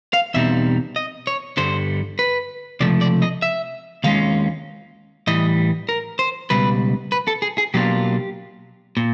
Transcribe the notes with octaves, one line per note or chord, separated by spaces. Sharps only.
F5
E2 B2 G3 C4 D#4 E5
D#5
C#5
G2 D3 G3 C5
B4
C#2 C3 F3 A3 D5
D5
D#5
E5
D#2 D#3 G#3 C#4 F4 F5
A2 E3 G3 D#5
A#4
C5
C#2 B2 G3 B4
B4
A4
G#4
G#4
B2 F#3 A#3 D4 F4 G4
A#2